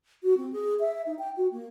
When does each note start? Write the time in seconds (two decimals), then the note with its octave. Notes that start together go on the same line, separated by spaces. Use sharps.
0.24 F#4
0.37 C4
0.53 G#4
0.80 E5
1.06 D#4
1.19 G5
1.37 F#4
1.52 A#3